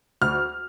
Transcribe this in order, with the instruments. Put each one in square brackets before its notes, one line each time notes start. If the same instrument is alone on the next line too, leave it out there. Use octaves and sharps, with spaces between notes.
[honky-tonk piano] D2 F6